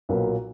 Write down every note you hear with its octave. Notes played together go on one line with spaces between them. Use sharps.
B1 A#2 F#3 A#3 B4